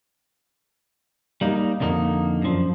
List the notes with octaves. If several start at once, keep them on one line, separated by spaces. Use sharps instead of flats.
G3 A#3 D#4
F2 D3 A#3 C#4 D#4
F#2 F3